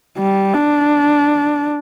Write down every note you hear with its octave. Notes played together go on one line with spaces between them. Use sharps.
G3
D4